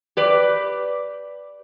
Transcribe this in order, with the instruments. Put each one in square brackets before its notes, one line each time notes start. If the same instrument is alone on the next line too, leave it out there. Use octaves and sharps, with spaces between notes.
[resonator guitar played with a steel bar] G4 B4 D5